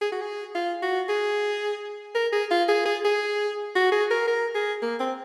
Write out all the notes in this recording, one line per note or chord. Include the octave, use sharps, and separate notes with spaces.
G#4
F#4
G#4
F4
F#4
G#4
A#4
G#4
F4
G#4
G#4
G#4
F#4
G#4
A#4
A#4
G#4
A#3
C4